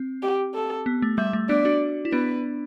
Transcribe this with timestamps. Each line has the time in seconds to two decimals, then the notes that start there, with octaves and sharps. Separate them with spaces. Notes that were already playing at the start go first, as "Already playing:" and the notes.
Already playing: C4
0.23 G4
0.55 A4
0.86 B3
1.02 A3
1.18 G3 E5
1.33 A3
1.49 B3 D4 D5
1.65 D4 F#4
2.05 E4
2.12 B3 D4 B4